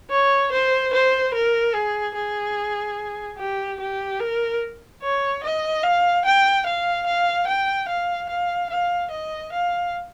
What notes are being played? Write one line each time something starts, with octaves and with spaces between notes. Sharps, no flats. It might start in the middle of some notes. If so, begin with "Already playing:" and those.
C#5
C5
C5
A#4
G#4
G#4
G4
G4
A#4
C#5
D#5
F5
G5
F5
F5
G5
F5
F5
F5
D#5
F5